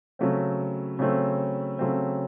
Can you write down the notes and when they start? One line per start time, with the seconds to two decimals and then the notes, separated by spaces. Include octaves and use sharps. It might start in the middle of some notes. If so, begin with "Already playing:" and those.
0.19 C#3 F#3 A3 C4
0.99 C#3 F#3 A3 C4
1.79 C#3 F#3 A3 C4